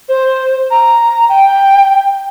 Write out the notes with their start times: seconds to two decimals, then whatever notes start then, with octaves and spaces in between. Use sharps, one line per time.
0.09 C5
0.71 A#5
1.29 G5